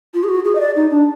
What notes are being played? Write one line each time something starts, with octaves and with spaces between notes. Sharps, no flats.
F4
G#4
F#4
G#4
D#5
D5
D#4
D4